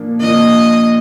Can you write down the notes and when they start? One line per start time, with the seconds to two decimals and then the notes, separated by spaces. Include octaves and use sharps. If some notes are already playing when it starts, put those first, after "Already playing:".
Already playing: A#2 F3 A#3 D4
0.19 A#2 F3 A#3 D4 D#5